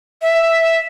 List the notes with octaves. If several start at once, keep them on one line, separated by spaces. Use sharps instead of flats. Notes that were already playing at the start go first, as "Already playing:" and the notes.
E5